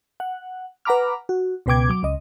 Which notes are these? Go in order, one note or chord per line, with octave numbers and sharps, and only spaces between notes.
F#5
B4 F#5 A#5 B5 D6 F6
F#4
C#2 B2 B4 G5 D6 G#6
F#3 D6
C#2 D#5